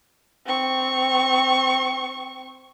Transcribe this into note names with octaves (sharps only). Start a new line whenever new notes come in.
C4 C#6